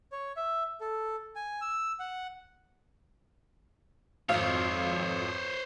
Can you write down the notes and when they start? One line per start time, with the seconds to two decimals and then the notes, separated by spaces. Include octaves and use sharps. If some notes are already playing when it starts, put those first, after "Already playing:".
0.12 C#5
0.37 E5
0.81 A4
1.36 G#5
1.61 E6
2.00 F#5
4.29 G#1 F2 C5 C#5 F5